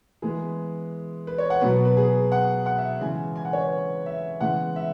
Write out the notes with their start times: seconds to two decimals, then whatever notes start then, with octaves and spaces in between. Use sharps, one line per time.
0.22 E3 G#3 B3 G#4
1.27 B4
1.38 C#5
1.50 F#5
1.61 B2 F#3 B3 B4
1.85 B4
1.97 G#4
2.32 F#5
2.66 F#5
2.78 E5
3.01 C#3 E3 G#3 G#5
3.36 G#5
3.45 F#5
3.53 C#5
3.62 B4
4.06 E5
4.41 C#3 E3 G#3 B3 F#5
4.76 E5